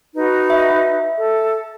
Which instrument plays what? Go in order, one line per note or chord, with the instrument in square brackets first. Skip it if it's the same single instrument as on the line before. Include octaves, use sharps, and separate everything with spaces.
[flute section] D#4 F#4 B4
[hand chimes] E5
[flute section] A4